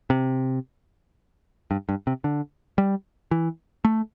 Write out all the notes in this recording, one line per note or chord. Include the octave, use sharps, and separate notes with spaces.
C3
G2
G2
C3
D3
G3
E3
A3